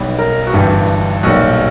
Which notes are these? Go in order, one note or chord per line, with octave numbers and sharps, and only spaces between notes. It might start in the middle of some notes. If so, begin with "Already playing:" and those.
Already playing: B1 B2 G3 B3 B4
A#4
F#4
G1 G2 E3 G4
B1 A#2 G3 F#4